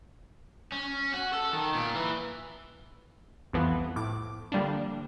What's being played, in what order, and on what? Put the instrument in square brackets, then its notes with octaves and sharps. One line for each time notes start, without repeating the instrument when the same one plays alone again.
[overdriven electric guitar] C#4
F#4
A4
D#3
A#2
E3
[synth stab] C2 F2 E3 F3 B3
A2 D6
D3 F3 G3 A#3 D4